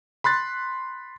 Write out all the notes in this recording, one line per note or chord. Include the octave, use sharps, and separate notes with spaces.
B5 C6 F#6 A6